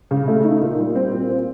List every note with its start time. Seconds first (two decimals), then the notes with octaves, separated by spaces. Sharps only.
0.11 C#3
0.28 A3
0.44 D#4
0.62 A#2
0.78 G3
0.95 C4
1.12 A#2
1.29 C4